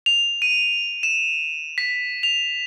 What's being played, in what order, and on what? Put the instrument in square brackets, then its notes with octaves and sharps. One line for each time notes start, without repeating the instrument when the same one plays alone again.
[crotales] F7
D#7
E7
B6
F7